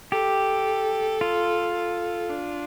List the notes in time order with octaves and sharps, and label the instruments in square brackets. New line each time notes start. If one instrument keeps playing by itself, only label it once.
[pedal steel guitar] G4 [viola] A4
[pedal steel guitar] F4
[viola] A4
D4